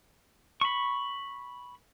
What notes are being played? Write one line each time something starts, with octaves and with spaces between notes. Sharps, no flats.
B5 C#6